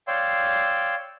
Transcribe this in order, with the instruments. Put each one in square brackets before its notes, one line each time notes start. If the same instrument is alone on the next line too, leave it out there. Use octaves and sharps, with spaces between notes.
[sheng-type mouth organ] C#5 D5 F5 G5 C6 E6